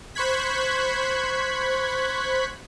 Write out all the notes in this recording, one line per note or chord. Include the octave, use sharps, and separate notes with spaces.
C5 B5 C#6 F#6 G#6 B6